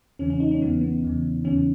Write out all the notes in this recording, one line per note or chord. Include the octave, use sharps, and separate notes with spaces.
E2 C#3 E3 C#4
C#4
D#4
C#4
E2 C#3 E3 B3
B3
E2 C#3 E3
E2 C#3 E3 C#4